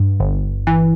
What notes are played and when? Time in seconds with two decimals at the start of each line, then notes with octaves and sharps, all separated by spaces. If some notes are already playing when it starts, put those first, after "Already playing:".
Already playing: G2
0.20 G1
0.67 E3